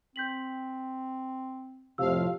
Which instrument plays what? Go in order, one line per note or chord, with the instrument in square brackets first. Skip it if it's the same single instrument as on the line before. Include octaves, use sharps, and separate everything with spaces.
[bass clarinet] C4 [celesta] G6 B6 F#7
[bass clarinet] F2 [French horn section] A2 F3 [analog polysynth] C3 F5 [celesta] G4 E6